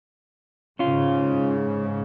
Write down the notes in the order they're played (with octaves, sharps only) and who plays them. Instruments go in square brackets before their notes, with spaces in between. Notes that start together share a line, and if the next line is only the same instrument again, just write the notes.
[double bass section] G#2 C#3 [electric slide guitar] C#4 F4